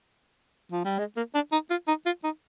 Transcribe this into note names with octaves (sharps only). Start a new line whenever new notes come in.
F3
G3
G#3
A#3
D4
D#4
F4
D#4
F4
D#4